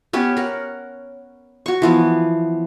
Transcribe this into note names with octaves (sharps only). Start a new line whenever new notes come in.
B3 C#4 G4 C#5
A#4 F#5
F#4 C#6
E3 F3 B3